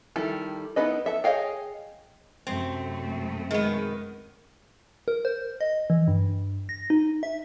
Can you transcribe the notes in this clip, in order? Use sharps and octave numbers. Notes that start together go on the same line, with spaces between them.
D#3 G3 E4 A4
B3 D#4 E4 B4 D#5
A4 E5
G#4 C#5 D#5 F5 G5
F#2 C3 A3 C4
D#3 G#3 B3
A#4
C5
D#5
E3
G2
A#6
D#4
E5